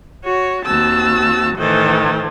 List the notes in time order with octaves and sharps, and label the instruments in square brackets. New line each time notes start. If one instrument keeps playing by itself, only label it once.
[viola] F#4 C#5
[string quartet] D#2 F#4 E6 [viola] C4 A5
[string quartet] A2 D#3 E3 [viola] A4 C5